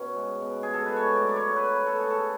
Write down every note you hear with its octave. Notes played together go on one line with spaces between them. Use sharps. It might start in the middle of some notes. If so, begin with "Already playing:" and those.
Already playing: B2 C#4
G#3
B2
G#4
G#3 A4
B4
A3 C#5
D5
F#3
D5
C#5
C#4
B4
A3 B4
A4
C#4 G#4
A4